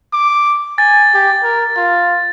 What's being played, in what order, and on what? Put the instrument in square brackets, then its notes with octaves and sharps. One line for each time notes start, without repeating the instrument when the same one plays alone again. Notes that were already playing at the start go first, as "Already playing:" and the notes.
[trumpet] D6
[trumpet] G#5 [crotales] A6
[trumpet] G4
A#4
F4